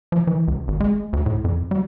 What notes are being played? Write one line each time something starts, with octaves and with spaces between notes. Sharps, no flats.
F3
E3
C#2
G#1
G#3
D2
A2
F2
G3